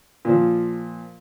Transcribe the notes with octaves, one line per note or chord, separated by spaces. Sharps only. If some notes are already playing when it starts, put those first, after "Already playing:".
A#2 F3